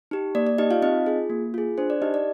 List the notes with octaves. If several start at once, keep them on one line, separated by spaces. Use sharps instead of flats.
D#4 G4
A#3 D5
D5
D#4 G4 D#5
F4 F5
C4 D#4 D#5
F4 G#4
A#3
F4 G#4
D4 C5
D5
D#4 G4 D#5
D5